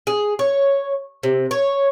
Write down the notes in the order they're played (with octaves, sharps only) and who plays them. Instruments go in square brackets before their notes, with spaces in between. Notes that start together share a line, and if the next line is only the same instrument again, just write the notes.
[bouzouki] G#4
C#5
C3
C#5